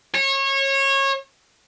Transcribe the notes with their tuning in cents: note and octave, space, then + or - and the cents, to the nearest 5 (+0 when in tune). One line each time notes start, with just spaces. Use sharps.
C#5 -25